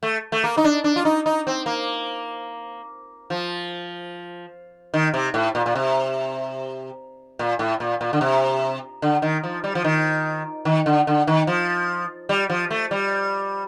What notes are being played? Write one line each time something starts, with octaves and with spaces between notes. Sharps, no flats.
A3
A3
A#3
D#4
D4
D4
F4
D#4
D#4
C4
A#3
F3
D#3
C3
A2
A#2
A#2
C3
A#2
A2
A#2
A#2
D3
C3
D3
D#3
F3
G3
F3
D#3
D#3
D3
D3
D#3
F3
G3
F3
A3
G3